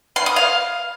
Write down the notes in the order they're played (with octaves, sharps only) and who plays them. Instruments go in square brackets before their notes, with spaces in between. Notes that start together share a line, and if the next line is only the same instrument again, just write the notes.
[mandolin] C6
D#6
F5